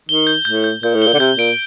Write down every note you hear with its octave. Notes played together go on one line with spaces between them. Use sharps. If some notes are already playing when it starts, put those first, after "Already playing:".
D#3 G7
G6
A2 G6
G6
A#2 G6
A2
G7
A#2
D3
C3 G6
A#2 D7